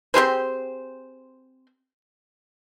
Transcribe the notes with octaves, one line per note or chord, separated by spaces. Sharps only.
C4 G4 G#4 C5